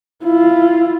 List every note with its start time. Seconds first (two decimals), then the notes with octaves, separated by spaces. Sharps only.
0.24 E4 F4